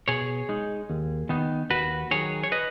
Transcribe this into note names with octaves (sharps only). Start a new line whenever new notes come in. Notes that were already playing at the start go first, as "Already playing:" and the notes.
B2 G#4 C#5
G#3 D#4
D#2
D#3 B3 D#4
D#2 F#4 B4
D#3 F#3 G#4 C#5
C#5
B4 D#5